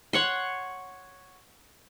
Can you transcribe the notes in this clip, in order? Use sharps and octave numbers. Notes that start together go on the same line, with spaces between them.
C#5 F#5 C6